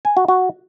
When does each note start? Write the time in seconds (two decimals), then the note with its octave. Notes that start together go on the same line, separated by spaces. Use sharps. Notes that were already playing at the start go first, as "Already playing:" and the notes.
0.05 G#5
0.17 F#4
0.28 F#4